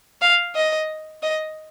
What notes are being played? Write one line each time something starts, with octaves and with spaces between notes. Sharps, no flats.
F5
D#5
D#5